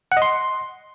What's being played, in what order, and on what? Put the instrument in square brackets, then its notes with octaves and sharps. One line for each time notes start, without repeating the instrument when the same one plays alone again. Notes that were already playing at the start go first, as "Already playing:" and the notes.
[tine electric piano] F#5
D#5
C6